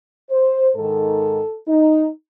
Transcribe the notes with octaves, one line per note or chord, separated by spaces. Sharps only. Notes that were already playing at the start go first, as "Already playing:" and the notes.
C5
G#2 D#3 A4
D#4